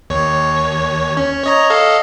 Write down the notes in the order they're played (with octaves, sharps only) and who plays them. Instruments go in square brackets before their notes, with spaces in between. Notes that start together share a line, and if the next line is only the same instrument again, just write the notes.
[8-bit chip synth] D#2 C#5
C#4
C#5 D#5 A#5
A4 D#5 F5